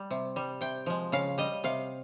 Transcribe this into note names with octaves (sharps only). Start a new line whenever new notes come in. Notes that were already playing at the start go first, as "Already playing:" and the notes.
Already playing: G3
C3
G3
C3 G5
F3 G#3
C#3 F5
G3 D#5
C3 F5